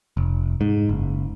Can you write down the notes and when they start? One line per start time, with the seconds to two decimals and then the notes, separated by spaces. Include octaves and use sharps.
0.17 F1
0.61 G#2
0.89 F#1